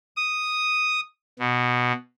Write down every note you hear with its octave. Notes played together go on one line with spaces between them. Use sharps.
D#6
B2